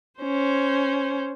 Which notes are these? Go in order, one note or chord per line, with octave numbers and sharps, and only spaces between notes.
C#4 C5